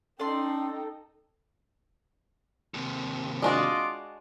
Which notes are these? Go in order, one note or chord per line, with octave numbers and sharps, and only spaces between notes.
C#4 D#4 A4 D5 G5 C6
D#2 C3
G#3 D4 F4 F#4 D#5 D6